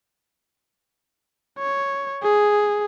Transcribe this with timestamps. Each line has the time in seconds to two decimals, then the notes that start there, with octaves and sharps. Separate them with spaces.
1.59 C#5
2.23 G#4